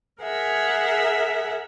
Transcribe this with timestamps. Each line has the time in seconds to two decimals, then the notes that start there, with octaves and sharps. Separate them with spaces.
0.23 G#4 A#4 E5 F#5